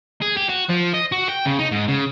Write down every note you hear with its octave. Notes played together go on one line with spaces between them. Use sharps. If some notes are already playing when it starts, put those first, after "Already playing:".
G#4
G4
F#4
F3
D#5
F#4
G5
C#3
D#4
G#2
C#3